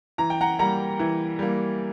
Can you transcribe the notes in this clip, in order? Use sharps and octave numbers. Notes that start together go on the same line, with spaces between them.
E3 A#5
G5
F#5 A#5
G3 A#3 F#5 A#5
E3
G3 A#3